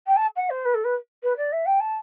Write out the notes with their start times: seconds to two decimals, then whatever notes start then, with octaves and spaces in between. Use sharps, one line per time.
0.07 G5
0.16 A5
0.36 F#5
0.50 C5
0.65 B4
0.74 A4
0.84 B4
1.23 B4
1.37 D5
1.52 E5
1.66 G5
1.80 A5